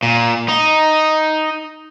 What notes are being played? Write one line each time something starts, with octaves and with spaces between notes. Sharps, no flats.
A#2
D#4